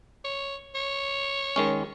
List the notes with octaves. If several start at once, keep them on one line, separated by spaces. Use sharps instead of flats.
C#5
C#5
D#3 G#3 C#4